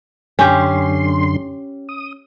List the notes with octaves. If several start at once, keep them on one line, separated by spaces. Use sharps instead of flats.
F#2 D3 C#4 G4 C6
D#6